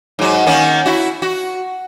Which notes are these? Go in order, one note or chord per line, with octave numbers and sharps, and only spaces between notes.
G#2 F#3
D#3 A#3 C#4
E4 F#4
F#4